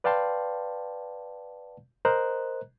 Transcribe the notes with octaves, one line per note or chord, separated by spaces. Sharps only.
B4 D5 F5 G5 A5 C6
A#4 C5 D#5 A#5 F#6